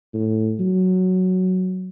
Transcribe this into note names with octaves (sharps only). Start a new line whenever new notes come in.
A2
F#3